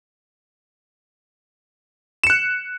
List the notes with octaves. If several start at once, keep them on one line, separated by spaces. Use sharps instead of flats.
F#6 C#7 E7